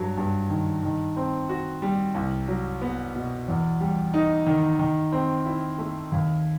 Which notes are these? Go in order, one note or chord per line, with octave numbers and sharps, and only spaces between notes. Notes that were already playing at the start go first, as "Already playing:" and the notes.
Already playing: G2 F#3
G2
D#3
D#3
C4
F#4
G3
C2
F#3
B3
B2
E2
G3
D#4
D#3
D#3
C4
E4
A3
D#2